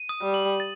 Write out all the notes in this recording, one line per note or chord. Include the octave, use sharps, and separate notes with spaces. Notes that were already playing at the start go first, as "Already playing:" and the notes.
Already playing: D#7
D#6
G3
F#7
A6